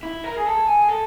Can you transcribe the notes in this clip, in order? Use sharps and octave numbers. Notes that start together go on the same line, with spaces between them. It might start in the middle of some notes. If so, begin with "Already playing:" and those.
E4
A#4
G#4
A4
G#4
A4